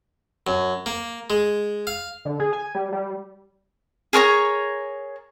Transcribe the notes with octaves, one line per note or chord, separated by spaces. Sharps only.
F#2
A#3
G#3
F5
D3
G#4
G#5
G3
G3
G#4 A#4 C#5 A#5